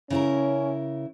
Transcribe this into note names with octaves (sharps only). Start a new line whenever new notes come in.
C#3 C#4 E4 A#4